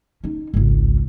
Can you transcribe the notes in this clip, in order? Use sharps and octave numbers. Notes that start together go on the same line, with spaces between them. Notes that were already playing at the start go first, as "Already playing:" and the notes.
C#4 D#4
G#1 C#2